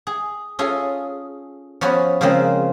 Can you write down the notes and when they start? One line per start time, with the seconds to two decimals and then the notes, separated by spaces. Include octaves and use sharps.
0.07 G#4
0.59 C#4 F4 G#4 A4 G#5
1.81 F3 B3 C#4 F#4 C#5 D#5
2.21 C#3 F3 G#3 A#3 C4 C#4